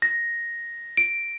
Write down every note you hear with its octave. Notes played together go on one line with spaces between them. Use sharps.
A#6
D7